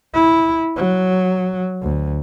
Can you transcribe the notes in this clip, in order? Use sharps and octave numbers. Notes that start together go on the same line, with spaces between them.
E4
F#3
D2